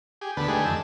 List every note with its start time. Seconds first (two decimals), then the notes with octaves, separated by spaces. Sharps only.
0.21 G4 G#4
0.37 D2 D3 B3 B4 A5
0.48 D3 D#3 G#3 A3 G4 G#4
0.65 F2 G#3 A5 E6